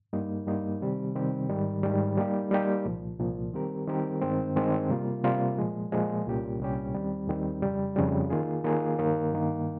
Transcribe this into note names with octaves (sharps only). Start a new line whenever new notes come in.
G2 G3 A#3 D#4
G2 G3 A#3 D#4
C3 D#3 G3 C4 G4
C3 D#3 G3 C4 G4
G#2 D#3 G3
G#2 D#3 G3
G3 A#3 D#4 G4
G3 A#3 D#4 G4
C2 A#2 F3
C2 A#2 F3
D#3 G3 C4 G4 A#4
D#3 G3 C4 G4 A#4
G2 D#3 G#3 C4
G2 D#3 G#3 C4
C3 G3 A#3 F4
C3 G3 A#3 F4
A#2 F3 G#3
A#2 F3 G#3
C2 A#2 G3 C#4 G4
C2 A#2 G3 C#4 G4
D#2 D#3 G3 C4
D#2 D#3 G3 C4
F2 C#3 G3
F2 C#3 G3
D#3 A#3 F4 G#4
D#3 A#3 F4 G#4
G2 D#3 A#3
G2 D#3 A#3